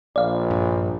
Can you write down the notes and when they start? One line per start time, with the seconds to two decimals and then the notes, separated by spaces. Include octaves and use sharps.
0.16 A#1 D5 F5
0.51 G2